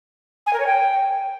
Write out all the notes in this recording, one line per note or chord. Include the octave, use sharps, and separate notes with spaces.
G#5
A#4
C#5
G5